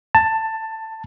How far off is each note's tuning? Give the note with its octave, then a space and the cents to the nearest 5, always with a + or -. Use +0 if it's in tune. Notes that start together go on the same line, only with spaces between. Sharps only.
A5 +15